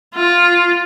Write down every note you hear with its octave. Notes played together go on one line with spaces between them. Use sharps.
F4